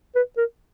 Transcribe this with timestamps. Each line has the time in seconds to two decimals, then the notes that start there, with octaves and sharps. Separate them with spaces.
0.15 B4
0.37 A#4